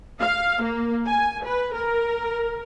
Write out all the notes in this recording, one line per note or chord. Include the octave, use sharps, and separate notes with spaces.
F5
A#3
G#5
B4
A#4